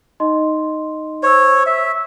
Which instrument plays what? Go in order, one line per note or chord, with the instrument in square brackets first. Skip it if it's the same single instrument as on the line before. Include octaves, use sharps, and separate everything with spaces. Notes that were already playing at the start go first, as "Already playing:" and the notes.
[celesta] D#4 D#5 C6
[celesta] C5 E6 [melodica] C#5
[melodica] E5